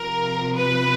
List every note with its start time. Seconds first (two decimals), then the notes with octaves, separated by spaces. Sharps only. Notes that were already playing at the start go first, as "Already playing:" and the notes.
Already playing: C3 F3 A#4
0.56 B4